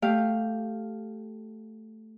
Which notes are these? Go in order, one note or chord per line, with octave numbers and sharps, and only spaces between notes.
A3 G4 F5